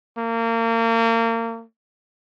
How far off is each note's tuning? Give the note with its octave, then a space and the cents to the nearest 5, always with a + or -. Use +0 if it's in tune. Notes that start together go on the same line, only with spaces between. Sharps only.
A#3 -30